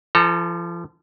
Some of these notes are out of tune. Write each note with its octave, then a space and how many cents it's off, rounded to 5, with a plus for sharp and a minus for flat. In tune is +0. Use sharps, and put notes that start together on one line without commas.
F3 -40 A4 +0 A#5 -20